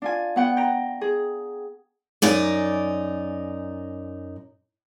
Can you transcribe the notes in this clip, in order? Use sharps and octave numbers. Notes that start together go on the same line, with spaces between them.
D4 F4 G#5
B3 F#4 F#5 G5
G5 A#5
G#4
F#2 D#4 D5 G#5